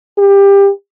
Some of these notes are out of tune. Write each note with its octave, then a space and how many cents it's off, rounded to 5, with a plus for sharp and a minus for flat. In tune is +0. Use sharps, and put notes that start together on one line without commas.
G4 +20